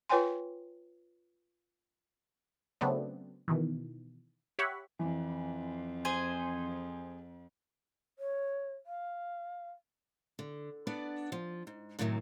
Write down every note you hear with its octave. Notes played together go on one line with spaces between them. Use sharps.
F4 B4 C#5 G5 G#5 C6
C#3 F#3 A3 B3 C4 D4
B2 D#3 E3
G4 C#5 E5 F#5 B5 C#6
F2 E3
G#4 C5 G#5
C#5
F5
D3
B3 D4 B4 D5 F#5
F3
G#2
F#2 A2 C3 D#3 E3 F#3